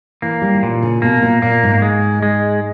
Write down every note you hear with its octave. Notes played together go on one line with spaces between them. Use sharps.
E3 A#3
G3
D#3
A#2 E3
C#3
B2 A#3
A#2
A#2 A#3
G#2
G#3
G#3